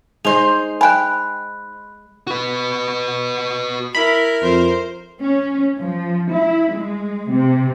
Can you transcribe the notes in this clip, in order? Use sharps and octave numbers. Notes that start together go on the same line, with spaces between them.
G#3 D#4 C5 F7
G5 G#5 B5 F#6
F#4 B4
E4 A#4 B5
F2 C5
C#4
F3
E4
G#3
C3